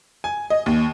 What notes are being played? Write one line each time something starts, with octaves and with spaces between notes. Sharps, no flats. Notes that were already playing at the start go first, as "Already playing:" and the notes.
G#5
D#5
D#2